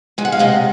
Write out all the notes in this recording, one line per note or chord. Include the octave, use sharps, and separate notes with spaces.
G#3 G#5
F#5
F5
C3 D#5 F#5